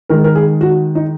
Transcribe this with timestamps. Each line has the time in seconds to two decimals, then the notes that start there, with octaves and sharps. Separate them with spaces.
0.09 D#3 G#3 A#4
0.24 A#4
0.36 G#4
0.61 F#4
0.95 D#4